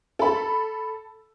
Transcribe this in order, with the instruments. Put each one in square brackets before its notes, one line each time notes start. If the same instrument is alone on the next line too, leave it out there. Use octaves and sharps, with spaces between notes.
[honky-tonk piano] A4 B5